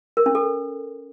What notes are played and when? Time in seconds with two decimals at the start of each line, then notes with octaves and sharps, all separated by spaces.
0.17 A#4
0.26 C#4
0.35 A4